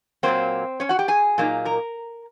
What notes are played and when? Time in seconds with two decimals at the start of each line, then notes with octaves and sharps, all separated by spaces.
0.23 A#2 F#3 A#3 C4 C5
0.80 C#4 C#5
0.89 F#4 F#5
0.99 G4 G5
1.08 G#4 G#5
1.38 A#2 F#3 A#3 D#4
1.65 A#4 A#5